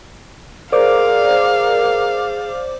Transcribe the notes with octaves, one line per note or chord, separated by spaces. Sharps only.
G#4 A#4 C5 D5 F5 D6